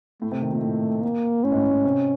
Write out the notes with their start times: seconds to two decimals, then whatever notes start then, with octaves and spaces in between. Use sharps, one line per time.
0.22 A2 A3
0.32 C3
0.42 D#3
0.52 A#2
0.63 A2
1.03 A#3
1.44 A2 C#4
1.52 G#2
1.57 A2
1.70 A2
1.84 C3